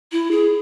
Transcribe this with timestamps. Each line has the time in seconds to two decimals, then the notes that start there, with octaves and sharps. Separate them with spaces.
0.12 E4
0.31 G#4